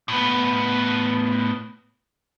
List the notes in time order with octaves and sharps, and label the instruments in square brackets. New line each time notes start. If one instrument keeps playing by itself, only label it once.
[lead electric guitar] A2 B3